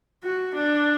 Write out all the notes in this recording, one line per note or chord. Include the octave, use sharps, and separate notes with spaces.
F#4
D4